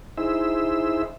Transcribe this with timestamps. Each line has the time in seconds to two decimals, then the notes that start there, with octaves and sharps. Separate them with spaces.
0.17 D#4 E4 G#4 C5 E5 E6